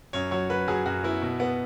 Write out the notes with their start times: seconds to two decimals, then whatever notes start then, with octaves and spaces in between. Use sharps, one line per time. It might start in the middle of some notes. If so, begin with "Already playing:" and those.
0.13 F#2 C#5
0.31 F#3 C#5
0.49 F#3 B4
0.68 F#3 G#4
0.86 F#2 F#4
1.03 B3 E4
1.22 B2
1.40 B3